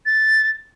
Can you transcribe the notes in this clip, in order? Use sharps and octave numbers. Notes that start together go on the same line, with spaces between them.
A6